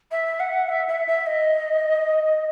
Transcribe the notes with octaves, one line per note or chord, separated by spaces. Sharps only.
E5
F#5
E5
E5
E5
D#5